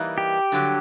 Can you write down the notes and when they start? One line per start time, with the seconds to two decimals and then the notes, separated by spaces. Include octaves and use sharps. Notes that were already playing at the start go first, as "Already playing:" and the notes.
Already playing: E3 G3 A#3 D#4
0.18 G4
0.52 G2 D3 F#3